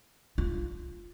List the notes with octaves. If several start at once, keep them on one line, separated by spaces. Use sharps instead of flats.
F4